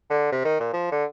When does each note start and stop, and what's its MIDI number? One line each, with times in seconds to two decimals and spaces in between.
0.10 0.29 50
0.32 0.41 48
0.45 0.56 51
0.60 0.70 46
0.73 0.90 53
0.92 1.05 50